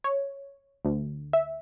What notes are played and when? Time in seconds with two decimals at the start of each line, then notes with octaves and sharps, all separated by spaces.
0.04 C#5
0.85 D2
1.33 E5